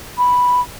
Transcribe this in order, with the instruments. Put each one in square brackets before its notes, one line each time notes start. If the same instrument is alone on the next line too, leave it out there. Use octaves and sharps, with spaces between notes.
[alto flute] B5